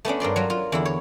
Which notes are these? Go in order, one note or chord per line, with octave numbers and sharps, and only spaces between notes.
A3 B3 C#4 D4
G2 A#4 D5 C6
F#3 F4
F4
E2 D3 E4
C#5